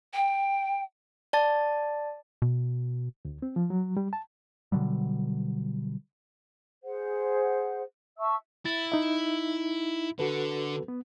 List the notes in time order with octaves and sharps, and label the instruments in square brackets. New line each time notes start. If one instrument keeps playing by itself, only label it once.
[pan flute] G5
[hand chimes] D5 A5 A6
[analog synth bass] B2
[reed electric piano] D2
C4
F3
F#3
G3
A5
[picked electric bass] B2 D3 F#3 G3
[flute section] G#4 C5 F#5
E5 A5 C#6 E6
[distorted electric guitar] E4 [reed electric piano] A6
[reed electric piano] D#4 E5
[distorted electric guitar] D3 [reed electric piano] F#4 A4 B4
[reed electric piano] B3